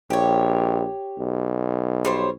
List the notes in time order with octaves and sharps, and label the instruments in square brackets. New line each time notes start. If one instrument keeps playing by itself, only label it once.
[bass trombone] A#1 [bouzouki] G4 C#5
[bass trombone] B1
[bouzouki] G3 C5 C#5